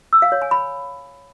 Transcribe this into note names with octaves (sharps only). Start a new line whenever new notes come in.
E6
F5
C#5
G#5
B5